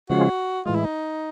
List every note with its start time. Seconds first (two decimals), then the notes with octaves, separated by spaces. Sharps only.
0.10 C#3 F3 G#3 C#4 F4 F#4
0.66 A2 E3 G#3 F4
0.76 E4
0.84 D#4